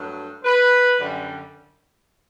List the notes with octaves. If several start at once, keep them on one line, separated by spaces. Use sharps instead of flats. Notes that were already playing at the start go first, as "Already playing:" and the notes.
Already playing: G2 F#3 A3
B4
F#2 D3 G3